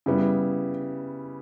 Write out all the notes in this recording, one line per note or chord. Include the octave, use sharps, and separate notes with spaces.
C#3 G3 B3 E4